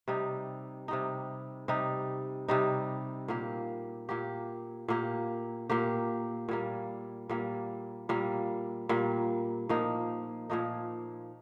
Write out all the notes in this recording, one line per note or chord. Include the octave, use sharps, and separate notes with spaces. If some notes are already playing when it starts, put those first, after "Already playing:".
C3 G3 D#4
C3 G3 D#4
C3 G3 D#4
C3 G3 D#4
A#2 A#3 G4
A#2 A#3 G4
A#2 A#3 G4
A#2 A#3 G4
A#2 G3 A#3
A#2 G3 A#3
A#2 G3 A#3
A#2 G3 A#3
A#2 F3 A#3 D#4
A#2 F3 A#3 D#4